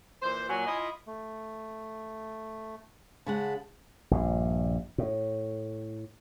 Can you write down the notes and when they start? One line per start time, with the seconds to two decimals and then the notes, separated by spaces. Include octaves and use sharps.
0.22 A#2 E3 C5
0.49 A#2 F#3 G#5
0.66 E4 F4 D#5
1.07 A3
3.26 C#3 G#3 F#5 A5 B5
4.11 A#1 G2
4.98 A2